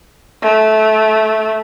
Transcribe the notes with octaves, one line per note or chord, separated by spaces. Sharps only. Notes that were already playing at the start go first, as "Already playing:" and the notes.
A3